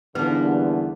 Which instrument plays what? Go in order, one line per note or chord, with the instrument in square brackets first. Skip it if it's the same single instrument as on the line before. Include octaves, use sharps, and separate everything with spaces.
[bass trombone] E2 [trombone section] D3 [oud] G3 A#3 B3 [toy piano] D#4 B4